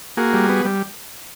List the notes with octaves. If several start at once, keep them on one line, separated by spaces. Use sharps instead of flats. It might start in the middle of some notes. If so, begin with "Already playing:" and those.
A#3 F#4 G#4
G3
B3
G3